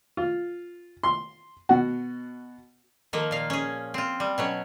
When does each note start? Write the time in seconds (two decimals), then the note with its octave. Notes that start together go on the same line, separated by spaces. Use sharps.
0.17 F4
1.03 C6
1.69 B2 F#4
3.13 D#3 F3 A#3
3.31 A#2 F5
3.50 C#4 G#4
3.94 C4 F4
4.20 G3
4.38 B2 F#3 C#4